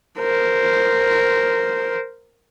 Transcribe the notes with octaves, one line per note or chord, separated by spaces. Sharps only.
A#4 C5